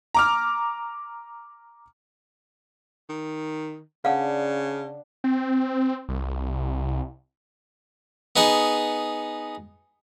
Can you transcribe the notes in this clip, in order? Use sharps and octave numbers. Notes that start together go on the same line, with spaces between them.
A#5 D6 F6
D#3
C#3 D4 F5 F#5
C4
C2
B3 D#4 G#4 F#5